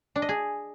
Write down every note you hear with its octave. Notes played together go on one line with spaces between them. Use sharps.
D4
D#5
G#4